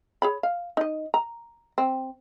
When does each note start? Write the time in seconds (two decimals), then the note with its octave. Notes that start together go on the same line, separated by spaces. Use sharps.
0.22 G#4 C#5 B5
0.43 F5
0.77 D#4 D#5
1.14 A#5
1.78 C4